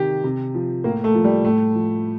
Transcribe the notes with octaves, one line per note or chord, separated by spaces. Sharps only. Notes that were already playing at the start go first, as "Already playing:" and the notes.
Already playing: C3 D#3 G4
C3
F3
A2 A#3
A3
F3
G3
A2 A3
F3